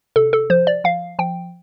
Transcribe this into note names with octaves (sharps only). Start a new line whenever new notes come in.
C3 A4
A4
F3 C5
D5
F3 F5
F3 G5